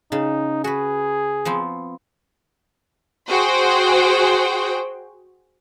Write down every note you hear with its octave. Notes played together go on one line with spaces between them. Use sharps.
C#3 D#4
F#4 G#4 B4
F3 B3 C4
F#4 G#4 C5 G5